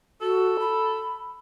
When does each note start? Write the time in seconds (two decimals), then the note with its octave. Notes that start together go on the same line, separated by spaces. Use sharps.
0.21 F#4 A4
0.60 B5